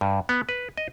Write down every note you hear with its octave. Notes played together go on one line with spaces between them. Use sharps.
G2
B3
B4
D#5